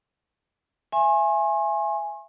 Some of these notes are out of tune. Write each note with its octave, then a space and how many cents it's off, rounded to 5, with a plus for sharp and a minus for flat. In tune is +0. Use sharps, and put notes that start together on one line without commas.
E5 +25 G#5 +0 C6 +45